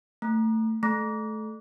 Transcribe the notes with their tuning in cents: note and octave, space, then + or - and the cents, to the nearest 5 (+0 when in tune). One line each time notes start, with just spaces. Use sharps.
A3 +20
A3 -20